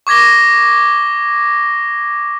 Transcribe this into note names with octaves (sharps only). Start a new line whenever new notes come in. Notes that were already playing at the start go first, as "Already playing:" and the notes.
C#6 D6 G#6 A#6 G7